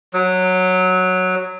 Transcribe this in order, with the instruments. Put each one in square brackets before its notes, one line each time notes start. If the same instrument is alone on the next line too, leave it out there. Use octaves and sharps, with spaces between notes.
[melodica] F#3